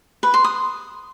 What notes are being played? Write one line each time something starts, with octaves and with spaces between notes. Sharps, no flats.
B4
C6
D#6